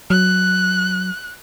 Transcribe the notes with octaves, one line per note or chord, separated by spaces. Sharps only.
F#3 F#6